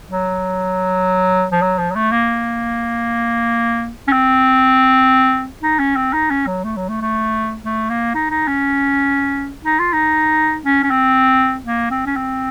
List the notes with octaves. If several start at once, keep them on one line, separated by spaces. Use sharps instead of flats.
F#3
F3
F#3
F3
F#3
A3
A#3
C#4
C4
D#4
C#4
C4
D#4
C#4
F#3
A3
F#3
A3
A3
A3
A#3
D#4
D#4
C#4
D#4
F4
D#4
C#4
C#4
C4
A#3
C4
C#4
C4